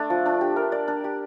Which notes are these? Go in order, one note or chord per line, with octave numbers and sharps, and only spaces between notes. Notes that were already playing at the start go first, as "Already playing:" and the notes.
Already playing: A3 D4
F3
D4
G4
A#4
D5
D4
G4